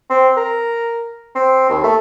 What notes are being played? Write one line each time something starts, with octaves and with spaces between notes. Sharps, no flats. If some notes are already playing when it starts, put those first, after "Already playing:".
C4
A#4
C4
D#2
A3